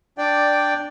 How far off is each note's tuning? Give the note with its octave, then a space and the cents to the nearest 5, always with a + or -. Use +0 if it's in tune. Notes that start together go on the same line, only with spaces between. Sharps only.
D4 +5 D5 +0 G5 +0